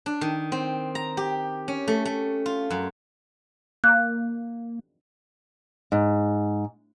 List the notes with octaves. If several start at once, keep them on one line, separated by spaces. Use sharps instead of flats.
D4
D#3
C4
A#5
G4
C#4
A3
A3
F4
F#2
A#3 F#6
G#2